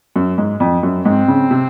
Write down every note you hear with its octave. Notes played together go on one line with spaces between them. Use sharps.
F#2
G#2
F2
F#2
G#2 C4
C#3
C3